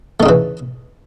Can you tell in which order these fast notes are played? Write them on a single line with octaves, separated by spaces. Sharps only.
A3 D#4 C#3 E3